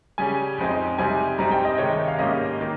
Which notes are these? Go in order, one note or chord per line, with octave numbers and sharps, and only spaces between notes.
C#3 G3 C#4 G#5
F2 C#3 G#3 C4 D#4
C3 G3 C4 D#4 G#5
G2 G3 C4 D#4 A#5
G5
D#5
C3 D#3 G#3 D#4 C#5
F5
G#2 G3 A#3 C#4 D#5
D#3 A#3